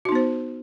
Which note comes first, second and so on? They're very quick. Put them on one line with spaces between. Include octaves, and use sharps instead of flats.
F#4 D#4 B3 C5